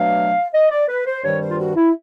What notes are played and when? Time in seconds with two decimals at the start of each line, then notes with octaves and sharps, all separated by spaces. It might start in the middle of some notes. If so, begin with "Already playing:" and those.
Already playing: B2 F#3 A3 D4 F5
0.53 D#5
0.70 D5
0.88 B4
1.06 C5
1.24 G2 D#3 G3 C4 C#5
1.40 C5
1.50 F4
1.58 F#4
1.76 E4